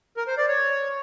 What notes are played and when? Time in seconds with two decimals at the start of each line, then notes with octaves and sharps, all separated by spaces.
0.17 A#4
0.27 C5
0.38 D5
0.48 C#5